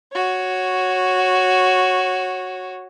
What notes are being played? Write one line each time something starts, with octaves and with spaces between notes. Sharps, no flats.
F#4 C#5